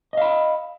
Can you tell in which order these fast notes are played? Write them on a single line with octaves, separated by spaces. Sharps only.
D#5 F5 B5